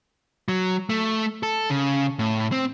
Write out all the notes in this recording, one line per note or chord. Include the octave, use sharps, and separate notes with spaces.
F#3
A3
A4
C#3
A2
C4